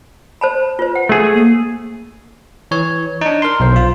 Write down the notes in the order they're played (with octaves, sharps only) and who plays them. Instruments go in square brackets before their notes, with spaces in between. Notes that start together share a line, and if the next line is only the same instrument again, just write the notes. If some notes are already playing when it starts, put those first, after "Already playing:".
[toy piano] C5 A5 B5
F4 B4 C5
F#5
[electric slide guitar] A3 G#4
[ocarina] A#3
[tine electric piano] E3 C#5
D4 D#4
A#4 C6
B1 C5
F4